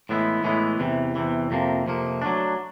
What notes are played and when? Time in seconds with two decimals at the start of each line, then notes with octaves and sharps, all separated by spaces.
0.09 A2 E3 G#3 B3 E4
0.44 A2 E3 G#3 B3 E4
0.80 E2 C3 E3
1.15 E2 C3 E3
1.51 F2 C3 F3 A#3
1.87 F2 C3 F3 A#3
2.22 F#3 A3 D4